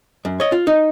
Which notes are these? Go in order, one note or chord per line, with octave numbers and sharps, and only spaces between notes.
F#2
C#5 D#5
F4
D#4